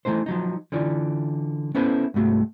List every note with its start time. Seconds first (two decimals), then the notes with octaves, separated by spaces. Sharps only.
0.05 E3 F3 A3 D#4 C5
0.26 F3 F#3 D#4
0.72 D3 E3 F4 D5
1.75 B3 C#4 E4 A4 B4 C5
2.14 C2 G#2 A3 F#4